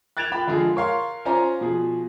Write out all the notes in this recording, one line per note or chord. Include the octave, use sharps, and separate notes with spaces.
F#6 G#6 A6 D7 E7 F7
F4 G5 B5
D3 F3 G#3 F4 G#4
A#4 C#5 F5 C6
C#4 F4 C5 D5 G#5 A#5
B2 F3 G#4